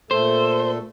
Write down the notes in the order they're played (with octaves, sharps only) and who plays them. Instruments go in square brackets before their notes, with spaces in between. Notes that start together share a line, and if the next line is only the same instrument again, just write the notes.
[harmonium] A#2 A3 A4 [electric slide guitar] C5